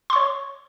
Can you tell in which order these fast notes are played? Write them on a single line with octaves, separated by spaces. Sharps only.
C6 C#6 C#5